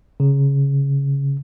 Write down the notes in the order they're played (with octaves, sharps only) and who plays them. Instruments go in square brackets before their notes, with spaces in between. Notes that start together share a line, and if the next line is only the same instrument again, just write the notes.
[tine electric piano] C#3